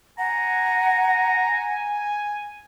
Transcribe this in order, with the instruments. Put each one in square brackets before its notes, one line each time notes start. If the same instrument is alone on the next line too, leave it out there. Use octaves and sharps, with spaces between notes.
[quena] F#5 [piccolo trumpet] G#5 [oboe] A#5